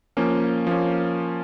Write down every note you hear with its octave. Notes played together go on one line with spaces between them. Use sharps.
F3 A#3 C#4
F3 A#3 C#4